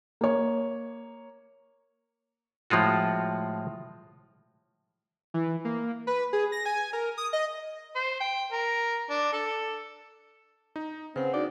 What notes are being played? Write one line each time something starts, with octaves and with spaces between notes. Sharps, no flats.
A#3 C#5
A2 F3 G#3 F4 F#4
E3
A#3
B4
G#4
A#6
G#5
A#4
D#6
D#5
C5
G5
A#4
D4
A4
D#4
C#3 C4 B4 F#5
D4 D#4 F#4 D5